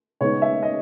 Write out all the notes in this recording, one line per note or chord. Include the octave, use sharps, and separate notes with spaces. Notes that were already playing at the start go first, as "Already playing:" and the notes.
C#3 G#3 B3 D#4 C#5
E5
D#5